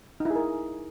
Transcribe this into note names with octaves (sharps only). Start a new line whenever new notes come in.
D#4
E4
G#4
A#4